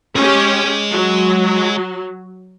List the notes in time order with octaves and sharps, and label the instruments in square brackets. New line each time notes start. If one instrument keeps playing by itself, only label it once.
[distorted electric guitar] G#3 G#4 [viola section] C#4 G4
[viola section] F#3